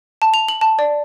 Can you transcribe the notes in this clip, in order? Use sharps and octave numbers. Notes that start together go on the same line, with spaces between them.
A5
F7
F#7
A5
D5